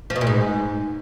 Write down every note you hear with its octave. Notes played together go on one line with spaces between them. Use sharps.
F3
B2
A#2
G#2